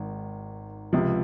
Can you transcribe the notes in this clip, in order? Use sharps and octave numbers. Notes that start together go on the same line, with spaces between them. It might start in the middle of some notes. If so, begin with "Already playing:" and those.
Already playing: G#1 D#3
C#2 C3 F3